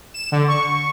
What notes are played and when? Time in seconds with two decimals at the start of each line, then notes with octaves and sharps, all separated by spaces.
0.14 E7
0.32 D3
0.48 C#6